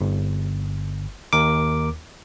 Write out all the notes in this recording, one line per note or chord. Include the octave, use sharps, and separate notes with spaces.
G1
D#2 A#4 D6